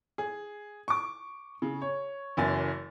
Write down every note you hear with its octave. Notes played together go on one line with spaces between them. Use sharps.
G#4
C#6 D6
C#3
C#5
F#1 F#2 E3 G#5 A6